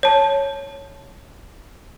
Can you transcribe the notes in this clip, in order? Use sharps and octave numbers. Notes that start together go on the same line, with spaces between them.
C#5 A5